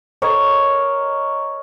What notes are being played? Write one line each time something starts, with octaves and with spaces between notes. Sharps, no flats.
A#4 C#5 D#5